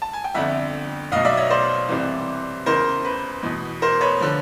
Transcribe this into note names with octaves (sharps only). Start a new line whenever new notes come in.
A5
G#5
G5
G1 F2 D3 E5 F#5
B1 B2 D#5 F5
D5 E5
C#5 D#5
C5 D5
C2 C3 E3
E2 C#3 E3 A#4 C5
B4
E2 B2
A#4 C5
B4 C#5
D3 F3